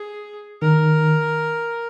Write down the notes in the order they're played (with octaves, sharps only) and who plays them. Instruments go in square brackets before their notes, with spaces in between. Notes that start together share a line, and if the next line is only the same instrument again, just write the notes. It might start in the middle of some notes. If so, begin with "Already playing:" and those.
Already playing: [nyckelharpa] G#4
[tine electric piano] D#3 [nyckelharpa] A#4